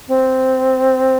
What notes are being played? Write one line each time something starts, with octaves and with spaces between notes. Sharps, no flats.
C4